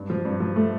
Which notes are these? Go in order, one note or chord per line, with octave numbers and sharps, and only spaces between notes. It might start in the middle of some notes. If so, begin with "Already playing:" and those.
Already playing: G2
F3
G2
F3
A3